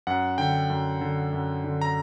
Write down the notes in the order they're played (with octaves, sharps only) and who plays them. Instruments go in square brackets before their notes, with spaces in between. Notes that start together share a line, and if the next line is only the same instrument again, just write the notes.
[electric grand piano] F#2 F#5
D3 G5
F#2
D3
F#2
D3
A#5